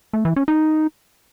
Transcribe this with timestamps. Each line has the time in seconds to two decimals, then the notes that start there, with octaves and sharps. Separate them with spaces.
0.13 A3
0.25 E3
0.36 C#4
0.48 D#4